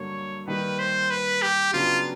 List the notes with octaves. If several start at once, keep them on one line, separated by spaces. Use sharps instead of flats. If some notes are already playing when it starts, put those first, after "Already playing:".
Already playing: G2 D3 F#3 A#3 C#5
D#3 G3 A#3 B4
C5
B4
G4
C#3 F#3 B3 D4 F4 G4